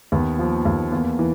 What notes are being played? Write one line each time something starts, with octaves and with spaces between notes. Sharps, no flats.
D#2 B3
F3
D#2
E2 A#3
E3